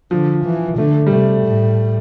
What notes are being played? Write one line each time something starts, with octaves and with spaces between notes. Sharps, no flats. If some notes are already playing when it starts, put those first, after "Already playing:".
D3 F3
E3
D3 A3
G3
C3 A3
A2